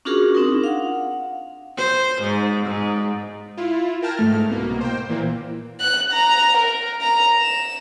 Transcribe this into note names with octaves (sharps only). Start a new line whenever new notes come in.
C#4 D4 F4 F#4 G#4 A#4
C4 D4 D#4 F4 A#4
F5 F#5
C5
G#2
G#2
E4 F4
A#4 G5 A5 F6 G#6 A#6
G#2 A3 F6
C2 B2 A#3
C5 G5
A#2 E3 A#3
F#6
A#5
A#4
A#5
E7